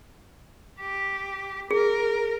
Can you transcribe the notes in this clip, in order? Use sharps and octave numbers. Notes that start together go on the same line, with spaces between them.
G4
G#4 A#4